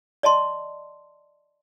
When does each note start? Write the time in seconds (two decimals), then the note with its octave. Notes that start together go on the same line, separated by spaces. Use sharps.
0.23 D5 D#5 A5 C6